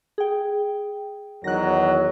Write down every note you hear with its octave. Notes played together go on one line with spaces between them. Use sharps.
G#4 G5
E2 D#3 F#3 F#6 A#6